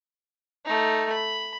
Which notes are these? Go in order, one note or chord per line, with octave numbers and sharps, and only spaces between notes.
A3 D#4
B5